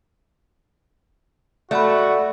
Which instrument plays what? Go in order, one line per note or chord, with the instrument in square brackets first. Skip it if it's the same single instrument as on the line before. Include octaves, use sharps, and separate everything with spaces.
[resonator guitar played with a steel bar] A3 [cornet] F#4 [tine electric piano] D5 F#5 B5